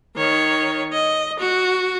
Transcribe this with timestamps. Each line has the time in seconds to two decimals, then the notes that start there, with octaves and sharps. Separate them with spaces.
0.16 D#3 C#5
0.93 D#5
1.39 F#4